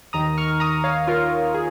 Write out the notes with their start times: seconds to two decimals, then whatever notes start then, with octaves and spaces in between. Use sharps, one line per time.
0.13 D#2 D#3 A#5 D#6
0.38 C#6 F6
0.60 A#5 D#6
0.84 C#5 F5
1.07 F4 A#4
1.54 G#4